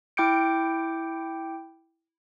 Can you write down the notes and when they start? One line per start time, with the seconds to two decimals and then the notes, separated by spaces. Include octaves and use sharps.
0.17 E4 G5 D6 G6 C#7 D7